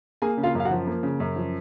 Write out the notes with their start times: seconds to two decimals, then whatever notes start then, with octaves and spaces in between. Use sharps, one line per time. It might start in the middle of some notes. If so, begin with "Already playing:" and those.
0.22 A#3 G#4 G#5
0.37 C#3
0.43 F4 F5
0.55 F#2 F5
0.65 F#4 F#5
0.71 F3
0.87 A#3
1.03 C#3
1.20 F#2
1.36 F3